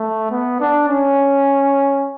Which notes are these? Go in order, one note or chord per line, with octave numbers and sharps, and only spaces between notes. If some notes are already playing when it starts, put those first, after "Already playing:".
Already playing: A3
B3
D4
C#4